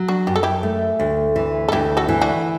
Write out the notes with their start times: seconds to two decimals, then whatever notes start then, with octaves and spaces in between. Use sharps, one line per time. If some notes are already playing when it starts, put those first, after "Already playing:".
Already playing: F#3
0.08 D4 F#4
0.27 F#2 G4
0.36 A4
0.43 E4 G4
0.63 A3
1.00 D2
1.36 E3
1.68 A4
1.72 D2 E4 G4
1.97 F#4 A4
2.08 E3
2.21 D4 F#4